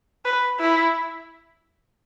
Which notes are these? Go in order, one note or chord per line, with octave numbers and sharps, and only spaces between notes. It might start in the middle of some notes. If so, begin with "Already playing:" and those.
B4
E4